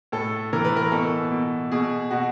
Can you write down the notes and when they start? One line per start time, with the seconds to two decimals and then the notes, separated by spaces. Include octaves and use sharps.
0.12 A2 A4
0.53 E3 A#4
0.65 B4
0.76 A#4
0.92 B2 A4
1.31 B2
1.72 B2 G#4
2.11 B2 F#4